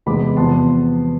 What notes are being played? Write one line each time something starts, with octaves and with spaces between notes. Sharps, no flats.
E2 C3 G#3 B3 B5 D6
E2 C3 F3 B3 A5 C6